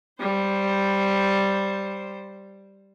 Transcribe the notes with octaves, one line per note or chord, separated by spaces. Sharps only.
G3 C5